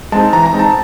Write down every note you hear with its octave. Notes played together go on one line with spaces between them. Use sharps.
G#3 C4 D#4 A5
E3 A#5
A#5
G#3 C4 D#4
A5